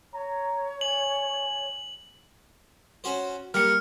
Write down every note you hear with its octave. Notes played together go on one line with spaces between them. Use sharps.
C#5 A#5
G#5 F#7
C#4 F#4 C5
G3 A#3 A#4 F6 C#7